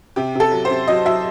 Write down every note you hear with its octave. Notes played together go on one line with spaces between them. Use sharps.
C3 G4
C3 A4
F#3
C5
C3
F#3 D#5
F#3 E5